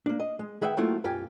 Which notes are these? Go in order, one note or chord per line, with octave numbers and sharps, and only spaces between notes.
A#3 D4
D#5
G#3
D#3 G#4 B4 E5 F#5 G5
F#3 A3 A#3 C4 E4 F4
B1 F#2 F4 G4 G#5